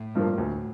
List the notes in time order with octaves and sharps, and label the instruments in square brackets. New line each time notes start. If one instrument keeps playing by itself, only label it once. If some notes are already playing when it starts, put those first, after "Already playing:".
Already playing: [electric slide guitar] A2
[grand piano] G2 F3 A#3
D2